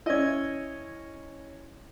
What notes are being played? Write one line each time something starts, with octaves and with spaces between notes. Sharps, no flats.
C#4 E4 D#5 G#6